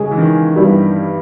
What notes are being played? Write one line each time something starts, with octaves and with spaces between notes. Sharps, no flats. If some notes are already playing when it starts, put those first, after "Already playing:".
Already playing: C#3 G#3 C#4 G#4
E3
D#3
G2 G3 B3 E4